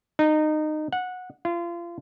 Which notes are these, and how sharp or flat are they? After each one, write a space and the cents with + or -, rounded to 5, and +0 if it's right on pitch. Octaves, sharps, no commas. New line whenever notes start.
D#4 -20
F#5 -15
F4 -30